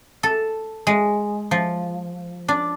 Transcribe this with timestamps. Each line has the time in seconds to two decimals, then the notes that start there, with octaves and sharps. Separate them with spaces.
0.23 A4
0.87 G#3
1.51 F3
2.48 D4